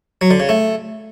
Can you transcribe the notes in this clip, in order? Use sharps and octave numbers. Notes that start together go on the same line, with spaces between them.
F#3
D3
C#3
A3